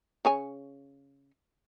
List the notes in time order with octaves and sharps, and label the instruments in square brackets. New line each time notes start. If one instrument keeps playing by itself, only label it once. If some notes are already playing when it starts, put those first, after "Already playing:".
[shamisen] C#3 C#5 G#5